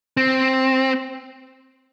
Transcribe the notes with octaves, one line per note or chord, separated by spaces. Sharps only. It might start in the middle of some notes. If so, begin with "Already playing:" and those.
C4